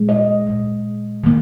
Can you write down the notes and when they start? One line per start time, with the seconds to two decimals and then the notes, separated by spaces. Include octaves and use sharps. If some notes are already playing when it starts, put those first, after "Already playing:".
Already playing: A#2 G#3
0.09 D#5
0.47 A#2 G#3
1.24 D#3 A#3